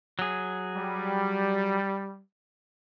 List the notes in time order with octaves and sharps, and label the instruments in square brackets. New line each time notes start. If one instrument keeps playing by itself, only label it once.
[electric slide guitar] F#3 G#4
[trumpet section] G3